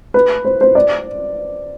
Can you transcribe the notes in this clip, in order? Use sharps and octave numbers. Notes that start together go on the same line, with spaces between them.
B4
C5
C5
D5